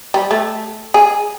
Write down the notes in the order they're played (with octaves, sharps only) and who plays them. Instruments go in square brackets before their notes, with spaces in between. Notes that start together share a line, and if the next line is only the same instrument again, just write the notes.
[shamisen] G3
A3
G#4